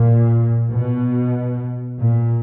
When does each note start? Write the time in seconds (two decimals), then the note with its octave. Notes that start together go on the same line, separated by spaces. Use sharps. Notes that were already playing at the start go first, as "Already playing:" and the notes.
Already playing: A#2
0.71 B2
2.00 A#2